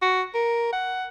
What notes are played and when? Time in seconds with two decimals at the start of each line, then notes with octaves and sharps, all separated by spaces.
0.02 F#4
0.35 A#4
0.73 F#5